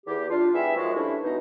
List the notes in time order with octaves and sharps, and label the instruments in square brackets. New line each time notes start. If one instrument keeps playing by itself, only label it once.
[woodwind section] E2 G4
D4 F4
G3 B3 E4 G#4 E5
D#2 F3 G#3 F#4
E3 G3 A3 C#4 D4 E4
B2 D#4